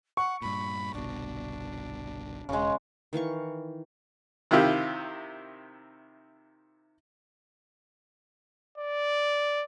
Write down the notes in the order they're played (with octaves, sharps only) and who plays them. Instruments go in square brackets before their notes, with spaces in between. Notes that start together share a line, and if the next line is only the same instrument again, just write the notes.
[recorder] F#5 [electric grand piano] C#6
[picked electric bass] G2 A#2 [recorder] B5
[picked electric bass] G1 C2 B2 [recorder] D4
[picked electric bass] E1 [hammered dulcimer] C#3 G#3
[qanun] D#3 E3 F5 C#6
[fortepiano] C3 D#3 E4 F4 G4
[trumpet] D5